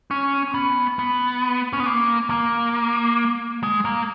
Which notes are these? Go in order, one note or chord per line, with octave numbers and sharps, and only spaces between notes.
C#4
B3
B3
C#4
B3
A#3
A#3
G#3
A#3